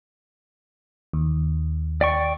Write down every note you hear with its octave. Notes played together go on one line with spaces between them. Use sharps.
D#2
D5 G5 C#6